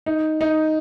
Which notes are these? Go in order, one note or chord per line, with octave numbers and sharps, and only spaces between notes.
D#4
D#4